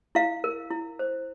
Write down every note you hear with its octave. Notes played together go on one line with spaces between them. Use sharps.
E4 F5
A#4
E4
C5